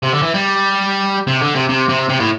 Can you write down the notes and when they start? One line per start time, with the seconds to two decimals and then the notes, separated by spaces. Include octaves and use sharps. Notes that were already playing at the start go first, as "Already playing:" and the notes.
0.03 C3
0.13 D3
0.23 E3
0.34 G3
1.27 C3
1.41 D3
1.54 C3
1.69 C3
1.89 C3
2.10 C3
2.20 A2